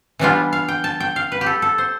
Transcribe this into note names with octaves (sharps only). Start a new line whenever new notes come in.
E3 G3 B3 D4 F4
F5
G5
A5
G5
F5
B4
G4
A4
A4
C5